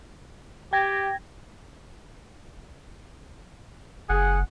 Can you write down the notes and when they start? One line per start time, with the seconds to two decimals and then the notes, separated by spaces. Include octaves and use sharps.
0.73 G4 G5 G#6 A#6
4.09 F#1 G#4 F#5